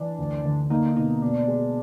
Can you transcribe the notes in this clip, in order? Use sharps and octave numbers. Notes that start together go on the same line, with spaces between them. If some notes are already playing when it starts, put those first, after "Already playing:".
Already playing: E3 D4
D2
D3
A#3 D#4
B2 D#4
B2 D4
G#3